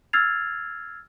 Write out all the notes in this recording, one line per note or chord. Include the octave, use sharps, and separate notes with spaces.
E6 F6 G#6 A6 C7 F7